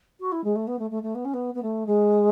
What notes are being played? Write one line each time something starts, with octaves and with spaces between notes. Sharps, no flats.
F#4
E4
G#3
A3
B3
A3
A3
A3
B3
C#4
B3
B3
A3
G#3